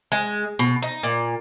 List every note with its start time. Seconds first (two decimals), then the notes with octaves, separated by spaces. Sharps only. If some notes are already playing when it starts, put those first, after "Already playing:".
0.12 G#3
0.59 B2
0.82 D#4
1.03 A#2